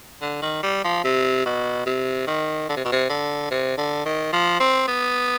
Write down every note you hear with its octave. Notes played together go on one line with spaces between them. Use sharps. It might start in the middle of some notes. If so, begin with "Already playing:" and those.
D3
D#3
G3
F3
C3
B2
C3
D#3
D3
C3
B2
C3
D3
C3
D3
D#3
F3
C4
B3